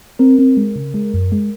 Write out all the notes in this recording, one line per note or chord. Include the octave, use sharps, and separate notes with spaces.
C4 A#4
C4
G#3
C#3
G#3
F#2
G#3